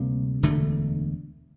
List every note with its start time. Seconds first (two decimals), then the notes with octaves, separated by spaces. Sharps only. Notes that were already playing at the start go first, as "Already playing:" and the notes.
Already playing: D2 C3 G3 A#3
0.43 E1 D2 D3 A3